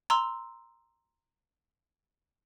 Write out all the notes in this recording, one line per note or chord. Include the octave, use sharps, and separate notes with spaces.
A#5 C6 E6